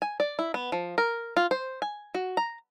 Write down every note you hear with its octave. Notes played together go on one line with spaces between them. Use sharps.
G#5
D5
E4
B3
F3
A#4
F4
C5
G#5
F#4
A#5